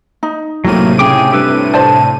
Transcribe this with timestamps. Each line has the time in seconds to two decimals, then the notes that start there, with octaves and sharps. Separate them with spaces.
0.23 D#4
0.65 A2 C3 F#3 A#3 D#7
0.99 C#3 G#4 G5 D6
1.32 G2 G4 A4 B4
1.73 C5 D5 A5